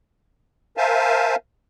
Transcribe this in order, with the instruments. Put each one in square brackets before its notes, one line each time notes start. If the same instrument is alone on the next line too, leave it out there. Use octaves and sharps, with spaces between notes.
[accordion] A#4 C5 E5 F5 G#5 A5